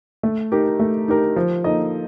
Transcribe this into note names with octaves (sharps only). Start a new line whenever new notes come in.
A3
D#4 G4 A#4
A3
D#4 G4 A#4
F3
A#3 D#4 A4 D#5